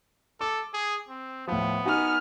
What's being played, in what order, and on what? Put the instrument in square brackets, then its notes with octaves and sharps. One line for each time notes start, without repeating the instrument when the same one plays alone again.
[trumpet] A4 [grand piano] D6
[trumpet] G#4
C4
[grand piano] A2 F3 [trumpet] B3
[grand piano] D#4 F#4 [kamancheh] G#5 F6